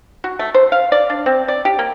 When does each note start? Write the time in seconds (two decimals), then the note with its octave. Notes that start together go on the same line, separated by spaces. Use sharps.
0.24 F#4
0.39 A3
0.54 C5
0.72 F5
0.92 D5
1.10 D4
1.26 C4
1.48 D5
1.65 G4
1.79 A#3